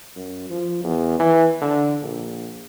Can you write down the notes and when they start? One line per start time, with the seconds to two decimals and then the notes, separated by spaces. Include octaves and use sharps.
0.16 F#2
0.50 F3
0.84 E2
1.19 E3
1.61 D3
2.03 A#1